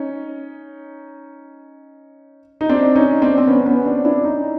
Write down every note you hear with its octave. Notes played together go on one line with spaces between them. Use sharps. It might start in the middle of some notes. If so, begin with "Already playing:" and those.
Already playing: C#4 D#4
D#4
C4 D4
C#4 D#4
C4 D4
C4
B3 C#4
B3 C#4
C4 D4
D4 E4
C#4 D#4